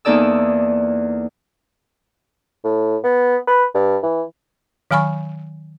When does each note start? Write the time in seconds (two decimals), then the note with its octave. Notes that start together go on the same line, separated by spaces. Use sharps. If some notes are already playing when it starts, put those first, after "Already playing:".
0.05 E2 A#3 D#4 A4 D5 E6
2.64 A2
3.04 B3
3.47 B4
3.74 G2
4.03 E3
4.91 D#3 F#3 G#5 B5 C#6